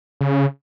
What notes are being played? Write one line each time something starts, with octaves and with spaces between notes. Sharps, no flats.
C#3